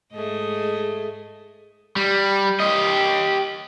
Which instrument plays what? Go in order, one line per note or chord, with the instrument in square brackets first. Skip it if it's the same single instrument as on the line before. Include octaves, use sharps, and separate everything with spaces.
[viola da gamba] G#2 G#4 [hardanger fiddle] A3 D#5
[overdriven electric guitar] G3
G4 D#5